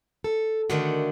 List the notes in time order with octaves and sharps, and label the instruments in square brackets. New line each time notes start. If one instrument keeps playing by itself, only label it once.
[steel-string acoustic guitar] A4
[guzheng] D3 D#3 A3 [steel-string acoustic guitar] D4 F#4